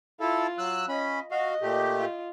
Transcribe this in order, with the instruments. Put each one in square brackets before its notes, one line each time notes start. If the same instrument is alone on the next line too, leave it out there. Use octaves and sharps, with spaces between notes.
[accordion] E4 A4 [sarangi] F4
[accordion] F#3 E6 F#6
[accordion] C#4 B5 [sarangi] D#5
[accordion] F#4 F5 [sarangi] D#5
[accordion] A#2 A3 G4
[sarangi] F4